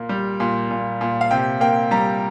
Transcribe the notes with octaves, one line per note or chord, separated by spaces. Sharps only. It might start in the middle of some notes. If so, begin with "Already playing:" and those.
Already playing: A#2 A#3
G3
A#2
A#2
A#2
F5
C3 G5
A#3 G5
G3 A#5